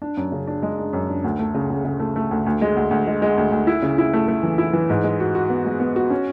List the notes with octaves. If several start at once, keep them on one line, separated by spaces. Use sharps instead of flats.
D4
F#2
C#3
D4
G#3
D4
F#2
D4
D2
A3
C#3
C#3
C#3
A3
A3
D2
D2
G#3
D2
D2
G#3
G#3
D2
D2
E4
C#3
E4
A3
A3
E3
E4
E3
G#2
G#3
F#4
F#4
B3
G#3
B3
F#4
C#4